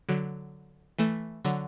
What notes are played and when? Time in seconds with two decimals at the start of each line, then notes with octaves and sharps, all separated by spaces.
0.09 D3 F#3
0.98 E3 A3
1.45 D3 F#3